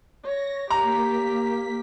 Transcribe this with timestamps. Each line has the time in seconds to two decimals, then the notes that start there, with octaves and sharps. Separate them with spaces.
0.24 C#5 A#6
0.70 A#3 G4 A#5 B6